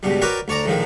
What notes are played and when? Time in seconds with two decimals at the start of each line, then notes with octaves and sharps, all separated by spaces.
0.03 C#2 G2 B2 G3
0.22 F#4 A#4 B4 C#5 D5 G5
0.48 D2 C#5 D5 A#5
0.66 A#1 A2 D#3 F3 G#3